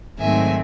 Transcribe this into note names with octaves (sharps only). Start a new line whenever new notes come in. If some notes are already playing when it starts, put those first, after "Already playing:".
G#2 D#3 F#3 A3 C4 E5 G#5